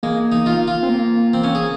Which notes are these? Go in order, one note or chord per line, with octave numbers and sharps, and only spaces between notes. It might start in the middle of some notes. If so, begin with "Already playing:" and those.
G#3 A#3
D#4
F4
F4
C4
A#3
C4
C#4
G#4